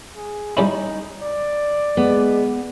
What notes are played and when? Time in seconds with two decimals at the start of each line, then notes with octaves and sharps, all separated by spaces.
0.16 G#4
0.57 G3 C#4 D#4 E4
1.22 D5
1.97 G#3 B3